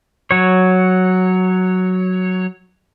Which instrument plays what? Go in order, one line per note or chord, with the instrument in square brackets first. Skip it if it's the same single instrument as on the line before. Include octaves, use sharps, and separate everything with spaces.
[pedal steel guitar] F#3 C#5